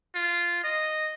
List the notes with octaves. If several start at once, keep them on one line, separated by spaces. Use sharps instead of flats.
F4
D#5